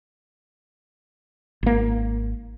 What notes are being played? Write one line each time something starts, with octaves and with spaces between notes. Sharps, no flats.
G#1 A#3